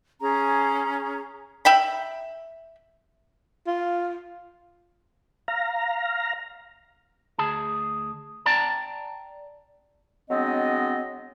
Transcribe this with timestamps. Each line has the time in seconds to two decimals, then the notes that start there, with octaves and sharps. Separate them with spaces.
0.20 C#4 G#4 A#5
1.65 E5 G5 B5
3.67 F4
5.48 F5 A#5
7.38 D2 G#4 A5
8.46 D5 G5 A5 A#5
10.30 F#3 G#3 B3 C4 D4 D#5